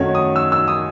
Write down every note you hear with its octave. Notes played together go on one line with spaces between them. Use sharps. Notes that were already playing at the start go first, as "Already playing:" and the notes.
Already playing: F#2 D#3 F#3 A3 C#4 C#5
D#6
E6
E6
D#6